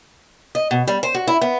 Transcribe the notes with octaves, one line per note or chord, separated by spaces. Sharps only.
D#5
B2
G3
C5
F#4
E4
B3